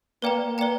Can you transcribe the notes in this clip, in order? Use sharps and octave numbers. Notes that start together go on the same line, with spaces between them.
A#3 B4 D5 G5 A#5
A#3
B4 D5 G5 A#5